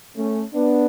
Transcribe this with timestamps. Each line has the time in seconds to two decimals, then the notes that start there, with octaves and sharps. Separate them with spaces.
0.16 A3 C#4
0.54 B3 D4